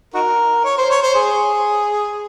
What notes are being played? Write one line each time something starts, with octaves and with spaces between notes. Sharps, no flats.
D#4 F#4 A#4
C#5
C5
C#5
C5
G#4